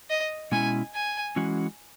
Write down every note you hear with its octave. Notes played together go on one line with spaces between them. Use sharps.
D#5
B2 G#3 C#4 E4 G#5
G#5
E3 G#3 C#4 F#4